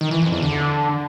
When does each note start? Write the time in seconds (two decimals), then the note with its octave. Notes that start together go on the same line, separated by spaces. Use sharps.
0.01 D#3
0.11 E3
0.22 F2
0.32 E2
0.42 D3